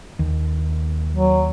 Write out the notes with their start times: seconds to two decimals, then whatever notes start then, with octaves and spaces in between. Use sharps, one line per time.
0.19 D#2
1.16 F#3